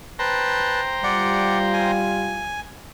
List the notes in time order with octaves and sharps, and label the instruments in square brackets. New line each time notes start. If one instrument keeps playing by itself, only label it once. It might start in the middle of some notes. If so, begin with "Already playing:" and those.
[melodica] B4 A5 [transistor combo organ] C5 G5 A#5
[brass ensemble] G3 F4 [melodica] D5 F#5
[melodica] G#5